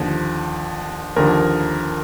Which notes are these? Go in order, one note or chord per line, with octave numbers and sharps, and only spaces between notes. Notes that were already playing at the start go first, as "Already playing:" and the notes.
Already playing: D#2 D3 F3
D#2 D3 F3 A#4